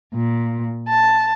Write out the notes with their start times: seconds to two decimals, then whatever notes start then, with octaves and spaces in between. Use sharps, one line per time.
0.14 A#2
0.87 A5